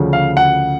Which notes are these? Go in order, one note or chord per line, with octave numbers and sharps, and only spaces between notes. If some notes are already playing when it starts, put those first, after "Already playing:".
Already playing: D2 C#3 F3
F5
F#5